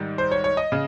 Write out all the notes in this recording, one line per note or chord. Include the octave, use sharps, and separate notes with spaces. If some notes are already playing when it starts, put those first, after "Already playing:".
Already playing: G#2 D#3 G3
C5
C#5
C#5
D#5
C#3